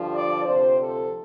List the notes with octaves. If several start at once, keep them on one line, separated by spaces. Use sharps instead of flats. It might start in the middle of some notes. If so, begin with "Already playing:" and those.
Already playing: G2 D3 F3
D5
D2 C3 F3 C5
A4